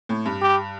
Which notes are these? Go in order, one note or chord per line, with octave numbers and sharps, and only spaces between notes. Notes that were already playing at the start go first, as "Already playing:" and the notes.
A2
G2
G4